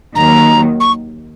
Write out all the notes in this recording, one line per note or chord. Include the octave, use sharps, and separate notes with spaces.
D#2 D#3 F#3 A#5
C#6